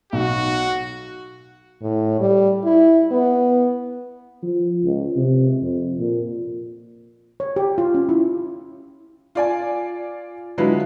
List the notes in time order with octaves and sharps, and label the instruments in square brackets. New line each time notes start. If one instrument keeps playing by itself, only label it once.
[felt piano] B1 [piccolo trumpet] F#4
[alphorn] A2
G3
E4
B3
[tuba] F3
C#2
C3
F2
A#2
[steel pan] C#5
G4
F4
C#4
E4
[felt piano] F4 D5 G#5
D3 F#3 G#3 E4 F4 B4